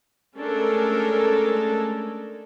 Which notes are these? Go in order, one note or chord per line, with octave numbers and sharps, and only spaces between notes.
G#3 A3 C#4 D4 A4 A#4